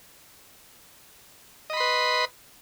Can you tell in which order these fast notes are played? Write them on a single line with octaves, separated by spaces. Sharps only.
D#5 B5 C6 B4